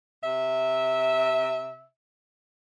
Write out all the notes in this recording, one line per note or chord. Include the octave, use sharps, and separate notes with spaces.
C3 E5